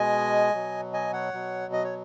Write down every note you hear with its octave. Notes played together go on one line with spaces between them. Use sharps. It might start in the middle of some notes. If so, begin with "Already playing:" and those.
Already playing: B2 G#3 D#5 G#5
B2 F#3
D#5 G#5
C#5 F#5
B2 F#3
D#5
C#5